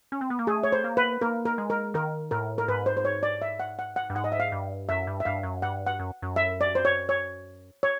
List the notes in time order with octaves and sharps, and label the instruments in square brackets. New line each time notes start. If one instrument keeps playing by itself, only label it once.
[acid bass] C#4
C4
B3
A#3
[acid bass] A3 [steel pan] G#4
[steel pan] C#5
C5
[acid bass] A#3
[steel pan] B4
[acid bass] A#3 [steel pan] A#4
[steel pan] A#4
[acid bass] G#3
[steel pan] A#4
[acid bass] D#3 [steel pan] A#4
[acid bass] A2 [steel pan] A#4
[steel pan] A#4
[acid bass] G#2 [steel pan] B4
[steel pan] C5
C5
C#5
D5
E5
F#5
F#5
F#5
[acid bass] G2
[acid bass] G#2 [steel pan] F#5
[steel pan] D#5
E5
F5
[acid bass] G2
[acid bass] F#2 [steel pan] E5
[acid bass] G2
[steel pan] E5
[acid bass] G2 [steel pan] F5
[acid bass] F#2
[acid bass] G2 [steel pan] F#5
[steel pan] F#5
[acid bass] F#2
F#2
[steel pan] E5
D5
C5
C#5
C#5
C#5